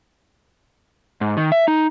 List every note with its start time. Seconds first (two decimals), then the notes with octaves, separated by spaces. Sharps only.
1.21 G#2
1.37 D#3
1.52 E5
1.68 D#4